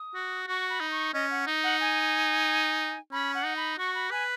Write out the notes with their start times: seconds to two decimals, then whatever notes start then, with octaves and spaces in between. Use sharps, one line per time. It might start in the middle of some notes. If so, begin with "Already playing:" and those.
Already playing: D#6
0.15 F#4
0.47 F#4 C#6
0.70 B5
0.80 D#4
0.91 C#6
1.14 C#4 D#5
1.31 F#5
1.47 D#4
1.64 F#5
1.80 G#5
3.12 C#4 B5
3.34 F#5
3.45 D#4
3.56 B5
3.78 F#4 C#6
3.95 B5
4.11 B4 G#5